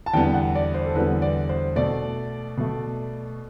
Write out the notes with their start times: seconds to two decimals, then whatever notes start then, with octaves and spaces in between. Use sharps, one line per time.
0.06 A5
0.14 E2 D3 G3 B3 G5
0.34 F#5
0.55 D5
0.74 C5
0.85 A4
0.95 E2 D3 G3 B3 B4
1.22 D5
1.49 C5
1.76 B2 A3 D5
2.57 B2 A3